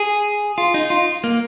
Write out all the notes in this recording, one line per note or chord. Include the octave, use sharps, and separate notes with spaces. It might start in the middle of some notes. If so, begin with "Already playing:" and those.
Already playing: G#4
F4
D#4
F4
A#3